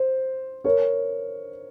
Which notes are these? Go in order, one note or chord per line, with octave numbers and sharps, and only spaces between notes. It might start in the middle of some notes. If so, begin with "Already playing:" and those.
Already playing: C5
A#4 C#5